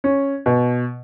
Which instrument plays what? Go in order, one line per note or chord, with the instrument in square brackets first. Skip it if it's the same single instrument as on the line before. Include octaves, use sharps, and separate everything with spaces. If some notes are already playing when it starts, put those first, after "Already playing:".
[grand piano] C#4
B2